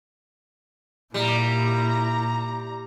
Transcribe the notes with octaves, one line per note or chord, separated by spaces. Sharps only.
A#2 G3 E4 A#5